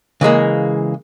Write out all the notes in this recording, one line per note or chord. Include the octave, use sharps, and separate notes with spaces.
C#3 E3 G#3 A#3